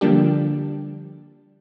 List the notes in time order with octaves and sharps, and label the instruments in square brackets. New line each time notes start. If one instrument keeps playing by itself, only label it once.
[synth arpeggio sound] D3 F3 G3 A#3 D4 G4